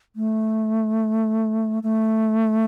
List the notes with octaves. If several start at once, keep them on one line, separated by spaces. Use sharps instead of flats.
A3
A3